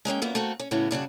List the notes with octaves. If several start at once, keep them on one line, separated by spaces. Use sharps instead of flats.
G#3 A#3 C#4 G5
F#2 A#2 A#3 B3
A3 A#3 C4 F#4
C#4
A2 C#3 E3 B3 C#4 F#4
G2 C#3 D4 F#4